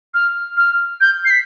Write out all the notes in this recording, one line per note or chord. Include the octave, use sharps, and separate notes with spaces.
F6
F6
G6
C7
B6